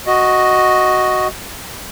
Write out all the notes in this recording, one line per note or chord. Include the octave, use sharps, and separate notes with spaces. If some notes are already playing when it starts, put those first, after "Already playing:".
F#4 D#5